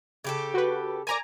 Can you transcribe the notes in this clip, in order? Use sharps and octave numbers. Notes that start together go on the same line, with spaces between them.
C#3 G4 A4
F#4 B4
A#4 B4 D5 G#5 A#5 D6